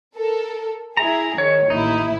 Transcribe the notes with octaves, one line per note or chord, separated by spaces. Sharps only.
A4 A#4
E4 G#4 A#5
D#3 C#5
A1 D#2 D#4 E4